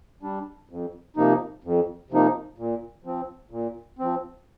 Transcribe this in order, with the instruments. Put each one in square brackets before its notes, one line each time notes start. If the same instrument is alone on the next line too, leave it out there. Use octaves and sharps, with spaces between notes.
[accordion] G3 D4
F2
C3 F3 A#3 D#4
F2
C3 F3 A#3 D#4
A#2
F3 C4
A#2
F3 C4